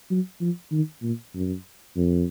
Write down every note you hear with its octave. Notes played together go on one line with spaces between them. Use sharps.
F#3
F3
D#3
A#2
F#2
F2